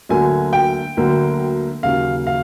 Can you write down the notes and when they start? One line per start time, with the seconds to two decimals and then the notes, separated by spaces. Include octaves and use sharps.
0.09 D2 D3 F#3 A#3 G#5
0.53 G5
0.97 D2 D3 F#3 A#3
1.83 D#2 C#3 F#3 F5
2.27 F5